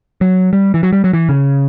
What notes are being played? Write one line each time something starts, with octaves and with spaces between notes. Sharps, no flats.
F#3
G3
E3
F#3
G3
F#3
E3
C#3